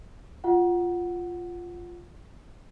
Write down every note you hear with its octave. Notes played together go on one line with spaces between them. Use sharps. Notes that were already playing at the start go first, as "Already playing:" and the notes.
F4 F#5